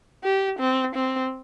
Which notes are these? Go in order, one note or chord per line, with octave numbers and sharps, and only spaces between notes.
G4
C4
C4